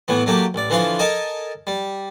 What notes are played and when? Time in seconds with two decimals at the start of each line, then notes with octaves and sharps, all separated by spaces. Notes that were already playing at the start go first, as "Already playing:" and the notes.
0.08 A2 E3 B3
0.26 F#3 A3 A#3 G4
0.54 A1 D5
0.70 D3 E3 F3 F5 C6
0.99 A4 A#4 D#5 G#5 A5
1.67 G3